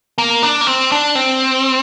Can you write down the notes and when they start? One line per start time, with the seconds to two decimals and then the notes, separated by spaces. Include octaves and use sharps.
0.18 A#3
0.43 D4
0.61 A#3
0.67 C4
0.92 D4
1.15 C4